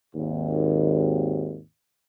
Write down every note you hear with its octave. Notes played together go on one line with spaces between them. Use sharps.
G#1 D#2